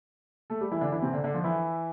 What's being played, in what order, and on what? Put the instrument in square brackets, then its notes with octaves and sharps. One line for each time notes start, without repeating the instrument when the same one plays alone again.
[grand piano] A3 A4
G3 G4
E3 E4
D3 D4
E3 E4
C3 C4
D3 D4
D3 D4
F3 F4
E3 E4